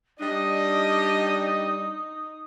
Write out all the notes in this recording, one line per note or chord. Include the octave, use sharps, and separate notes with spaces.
G3 D4 D#4 D#5 D#6